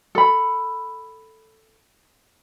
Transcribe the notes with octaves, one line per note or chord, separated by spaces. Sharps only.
A4 B5